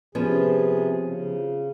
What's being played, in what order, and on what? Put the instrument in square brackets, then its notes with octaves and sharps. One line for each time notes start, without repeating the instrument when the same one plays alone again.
[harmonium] C3 G#4 [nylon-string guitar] F3 B3 C#4
[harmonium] C#3